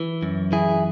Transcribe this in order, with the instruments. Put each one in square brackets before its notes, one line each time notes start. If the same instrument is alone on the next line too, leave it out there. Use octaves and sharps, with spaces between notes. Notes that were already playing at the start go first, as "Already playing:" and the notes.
Already playing: [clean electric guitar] E3
F#2
E3 E4 G#4